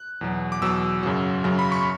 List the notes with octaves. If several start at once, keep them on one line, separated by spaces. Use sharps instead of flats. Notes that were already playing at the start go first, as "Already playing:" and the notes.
Already playing: F#6
E2 B2 F#3
D6
E2 B2 F#3 E6
F#2 C#3 F#3
F#2 C#3 F#3
B5
C#6